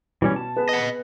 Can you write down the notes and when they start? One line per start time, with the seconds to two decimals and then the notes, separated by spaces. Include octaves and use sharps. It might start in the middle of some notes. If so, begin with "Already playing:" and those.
0.22 B2 E3 G3 C#4
0.36 A5
0.56 B3 G#4 B4
0.69 D#5 F#5